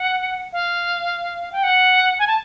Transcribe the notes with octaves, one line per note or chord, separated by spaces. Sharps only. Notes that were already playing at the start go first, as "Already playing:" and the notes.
Already playing: F#5
F5
G5
F#5
G#5
A5